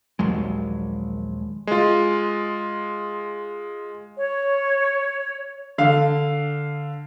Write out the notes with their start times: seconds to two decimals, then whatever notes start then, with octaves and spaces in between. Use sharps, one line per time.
0.19 A#1 D#2 F#3 G#3
1.67 G#3 F4
4.16 C#5
5.78 D3 F5